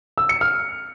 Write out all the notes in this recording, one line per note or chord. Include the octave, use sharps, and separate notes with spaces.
E6
C#7
F6